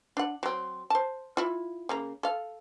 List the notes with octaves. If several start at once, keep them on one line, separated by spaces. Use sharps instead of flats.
D4 F#5
F#3 C4
C5 A5
E4 F4
C#3 A#3 A#5
A4 F5